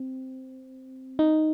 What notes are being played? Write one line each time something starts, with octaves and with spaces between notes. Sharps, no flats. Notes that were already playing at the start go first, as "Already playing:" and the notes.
Already playing: C4
D#4